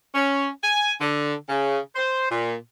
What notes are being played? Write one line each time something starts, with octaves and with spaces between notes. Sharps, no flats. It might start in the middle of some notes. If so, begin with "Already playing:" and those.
C#4
G#5
D3
C#3
C5
A#2